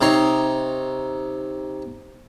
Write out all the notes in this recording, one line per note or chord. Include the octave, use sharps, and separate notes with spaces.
C3 D#4 C#5 C6